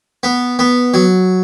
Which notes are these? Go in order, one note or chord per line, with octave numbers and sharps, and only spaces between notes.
B3
B3
F#3